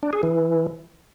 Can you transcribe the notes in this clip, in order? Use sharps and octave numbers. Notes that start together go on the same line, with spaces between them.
D4
G#4
E3